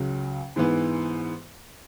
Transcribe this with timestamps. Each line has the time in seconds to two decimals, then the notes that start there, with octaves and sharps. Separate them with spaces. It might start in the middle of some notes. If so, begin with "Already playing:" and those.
Already playing: C#2 C#3 F#3
0.56 G#2 E3 B3